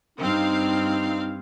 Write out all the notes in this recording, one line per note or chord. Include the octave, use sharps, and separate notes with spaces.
G2 C4 D#4 F5